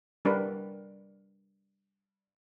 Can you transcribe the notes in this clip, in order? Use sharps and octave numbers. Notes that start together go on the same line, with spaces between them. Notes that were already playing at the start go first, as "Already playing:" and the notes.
G3 D4 A#4 B4